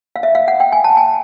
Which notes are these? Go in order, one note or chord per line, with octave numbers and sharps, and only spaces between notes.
F5
E5
F5
F#5
G5
G#5
A5
G#5